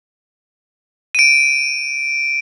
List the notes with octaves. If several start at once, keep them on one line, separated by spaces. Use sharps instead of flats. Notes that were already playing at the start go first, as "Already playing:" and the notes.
D7 D#7